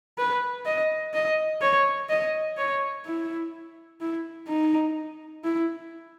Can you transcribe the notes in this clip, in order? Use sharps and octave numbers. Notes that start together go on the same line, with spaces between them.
B4
D#5
D#5
C#5
D#5
C#5
E4
E4
D#4
E4